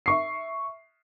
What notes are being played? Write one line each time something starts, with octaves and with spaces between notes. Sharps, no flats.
E5 C#6 C7